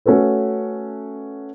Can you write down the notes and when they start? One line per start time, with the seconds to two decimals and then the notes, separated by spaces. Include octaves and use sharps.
0.06 A3 C#4 F#4 A4 B4